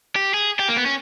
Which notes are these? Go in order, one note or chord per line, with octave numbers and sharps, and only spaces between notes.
G4
G#4
G4
A#3
B3
C#4